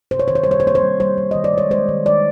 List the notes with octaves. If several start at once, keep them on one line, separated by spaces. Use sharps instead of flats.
C3 C5
C#5
D#3 C5
C#5
C5
G3 C#5
C5
A#3 C#5
C5
G3
G3 C5
G3
D#3 D#5
D5
G#3 C#5
G#3 C5
D#3
G#3 D5